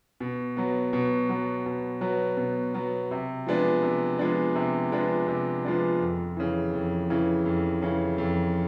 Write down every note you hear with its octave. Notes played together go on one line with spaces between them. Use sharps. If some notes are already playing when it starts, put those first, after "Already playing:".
B2
F#3 B3
B2
F#3 B3
B2
F#3 B3
B2
F#3 B3
C3
F3 G#3 B3 D4
C3
F3 G#3 B3 D4
C3
F3 G#3 B3 D4
C3
F3 G#3 B3 D4
F2
C#3 E3
F2
C#3 E3
F2
C#3 E3
F2